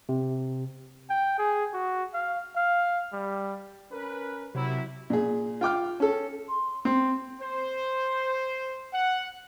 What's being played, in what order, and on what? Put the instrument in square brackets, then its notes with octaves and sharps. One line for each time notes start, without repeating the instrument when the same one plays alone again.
[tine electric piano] C3
[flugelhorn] G5
G#4
F#4
F5
F5
G3
[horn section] C#4 A#4 B4
[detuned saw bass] C3 [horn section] F#3 E4
[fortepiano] A#2 G#4
F4 G5 D6 F6
C#4 A4
[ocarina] C6
[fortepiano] C4 [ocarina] C6
[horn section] C5
F#5